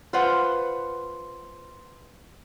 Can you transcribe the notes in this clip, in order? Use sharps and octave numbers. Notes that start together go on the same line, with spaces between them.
F4 B4 C5 F#5